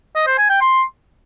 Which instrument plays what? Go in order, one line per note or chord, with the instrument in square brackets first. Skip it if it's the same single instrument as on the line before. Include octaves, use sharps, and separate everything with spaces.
[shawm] D#5
C5
G#5
G5
C6